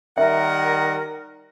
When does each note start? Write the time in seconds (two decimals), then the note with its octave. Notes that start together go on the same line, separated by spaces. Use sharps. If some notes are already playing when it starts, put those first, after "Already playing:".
0.18 D#3 G3 A#4 E5 F#5